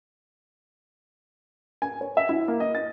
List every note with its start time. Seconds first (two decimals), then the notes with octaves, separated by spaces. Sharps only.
1.82 G#5
2.01 C#5
2.17 E5
2.29 E4
2.48 A#3
2.60 D#5
2.75 A6